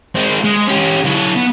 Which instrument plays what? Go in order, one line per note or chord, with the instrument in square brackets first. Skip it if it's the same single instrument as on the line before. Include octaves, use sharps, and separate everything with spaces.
[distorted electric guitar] G#3 C4
G#3
C#4 G4
F#3 E4
B3